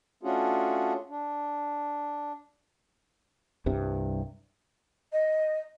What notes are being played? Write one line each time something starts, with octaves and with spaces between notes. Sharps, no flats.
A3 C#4 D4 F4 F#4 G#4
D4
C2 G2 C3
D#5